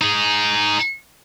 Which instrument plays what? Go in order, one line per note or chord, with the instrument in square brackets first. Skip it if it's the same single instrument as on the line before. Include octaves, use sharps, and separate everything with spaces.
[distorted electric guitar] D#4 G#4